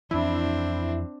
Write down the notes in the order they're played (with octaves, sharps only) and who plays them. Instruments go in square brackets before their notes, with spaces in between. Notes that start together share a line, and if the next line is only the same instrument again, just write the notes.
[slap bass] F2 E3 [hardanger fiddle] C4 D4 [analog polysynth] E4